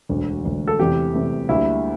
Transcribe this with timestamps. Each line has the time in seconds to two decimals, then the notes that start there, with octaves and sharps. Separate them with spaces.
0.09 E1 D2 D3
0.44 E1 D2 D3
0.68 A4
0.79 E2 C3 E3 A3 G4
1.14 E2 C3 E3 A3
1.49 D2 D3 G3 A#3 E4